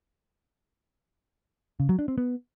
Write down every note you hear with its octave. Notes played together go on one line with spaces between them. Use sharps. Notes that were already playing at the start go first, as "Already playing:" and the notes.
C#3
F#3
D4
C4
B3